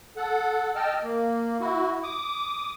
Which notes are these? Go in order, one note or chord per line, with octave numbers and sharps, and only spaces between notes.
A4 F#5
D#5 G5 A5 E6 F6
A#3
E4 F#4
D6 D#6